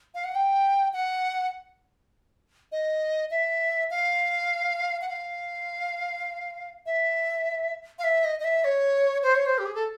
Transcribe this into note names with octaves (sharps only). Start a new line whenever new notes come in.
F5
F#5
G5
F#5
D#5
E5
F5
F#5
F5
E5
F5
E5
D#5
D#5
E5
C#5
C5
C#5
C5
G4
G#4
A4